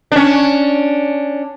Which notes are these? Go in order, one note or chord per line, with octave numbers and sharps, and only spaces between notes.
C#4 D4